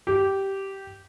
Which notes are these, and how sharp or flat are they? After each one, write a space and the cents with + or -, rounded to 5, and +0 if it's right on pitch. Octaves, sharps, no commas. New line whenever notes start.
G4 -10